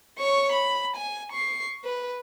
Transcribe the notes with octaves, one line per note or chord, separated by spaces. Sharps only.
C#5 C#6
B5
G#5
C#6 C7
B4